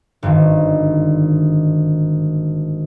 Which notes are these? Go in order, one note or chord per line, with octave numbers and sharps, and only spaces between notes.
G#1 G2 D3 D#3